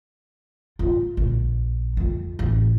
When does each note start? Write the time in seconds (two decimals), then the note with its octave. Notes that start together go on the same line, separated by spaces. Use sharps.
0.79 F4
1.17 A#1
1.97 F2
2.39 A1